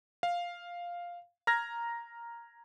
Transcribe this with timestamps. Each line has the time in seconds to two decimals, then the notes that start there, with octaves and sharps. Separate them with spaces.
0.23 F5
1.47 A#5 F6 G#6 A#6